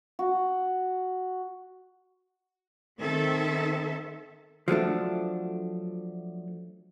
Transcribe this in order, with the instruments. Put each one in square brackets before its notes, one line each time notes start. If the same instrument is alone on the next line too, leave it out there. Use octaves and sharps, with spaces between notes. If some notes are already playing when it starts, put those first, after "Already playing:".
[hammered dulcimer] F#4
[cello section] D#3 C4 A4 E5
[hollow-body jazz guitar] F3 F#3 A3 D4